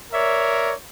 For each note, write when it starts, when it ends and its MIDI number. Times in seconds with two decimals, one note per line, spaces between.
0.12 0.72 70
0.12 0.72 73
0.12 0.72 74
0.12 0.72 76